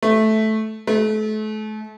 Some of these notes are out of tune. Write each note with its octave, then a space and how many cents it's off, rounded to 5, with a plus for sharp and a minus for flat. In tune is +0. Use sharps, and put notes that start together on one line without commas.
A3 -10
A3 -35